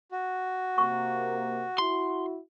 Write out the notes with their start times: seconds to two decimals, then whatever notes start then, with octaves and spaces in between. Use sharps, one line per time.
0.12 F#4
0.78 C3 A#3 C#6
1.78 E4 F#4 C6